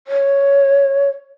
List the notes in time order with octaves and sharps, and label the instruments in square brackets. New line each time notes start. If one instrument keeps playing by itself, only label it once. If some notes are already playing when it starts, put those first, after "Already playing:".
[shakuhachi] C#5